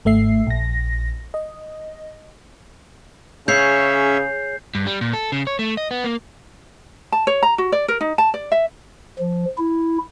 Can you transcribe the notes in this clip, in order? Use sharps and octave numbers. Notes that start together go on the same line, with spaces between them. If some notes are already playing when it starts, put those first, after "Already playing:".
G#1 A3 E5 C7
A#1 A#6
D#5
C#3 C#4 G#4 C#5 E5 G6 C7
G2
G3
A#2
A4
C#3
C#5
A3
D#5
B3
A#3
A5
C#5
A#5
F#4
D5
A#4
D#4
A5
D5
E5
F3
E4